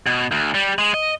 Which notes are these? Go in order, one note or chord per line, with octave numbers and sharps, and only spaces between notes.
B2
D2
G3
G#3
D#5